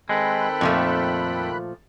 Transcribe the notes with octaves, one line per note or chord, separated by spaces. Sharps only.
D#3 G#3 C4 A4 G5 B5 F#6
F2 A#2 F3 A3